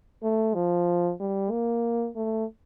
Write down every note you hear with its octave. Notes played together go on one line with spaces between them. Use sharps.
A3
F3
G3
A#3
A3